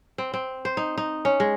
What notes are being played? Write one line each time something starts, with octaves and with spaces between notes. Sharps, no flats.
C4
C4
C5
D#4
D#4
C#4
G#3